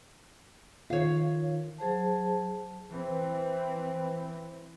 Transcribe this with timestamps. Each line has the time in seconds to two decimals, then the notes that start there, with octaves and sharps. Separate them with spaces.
0.90 D#3 D#4 F4 C#5 F5
1.78 F#3 G#4 C5 A5
2.91 E3 C4